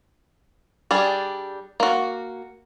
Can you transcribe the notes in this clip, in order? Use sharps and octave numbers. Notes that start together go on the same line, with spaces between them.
G3 D4 G#4
A#3 F#4